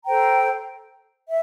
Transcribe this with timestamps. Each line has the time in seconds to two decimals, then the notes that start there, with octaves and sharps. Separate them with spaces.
0.05 A4 C5 G5 A#5
1.27 E5